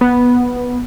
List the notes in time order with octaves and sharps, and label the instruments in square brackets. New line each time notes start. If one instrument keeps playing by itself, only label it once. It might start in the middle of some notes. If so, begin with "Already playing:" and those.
[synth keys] B3